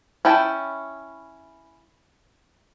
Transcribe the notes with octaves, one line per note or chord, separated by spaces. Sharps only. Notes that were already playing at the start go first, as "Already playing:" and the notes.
C#4 E4 G5 A5